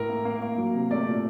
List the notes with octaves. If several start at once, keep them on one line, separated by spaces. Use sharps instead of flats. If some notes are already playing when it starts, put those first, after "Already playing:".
Already playing: A2 A#4
A#3
A#3
A#3
F#3
C3
A3 D5
A#2